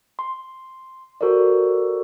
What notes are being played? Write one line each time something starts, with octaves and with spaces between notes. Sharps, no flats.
C6
F#4 A4 A#4 C5 D5